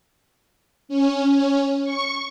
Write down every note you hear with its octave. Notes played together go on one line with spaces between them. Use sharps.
C#4
C#6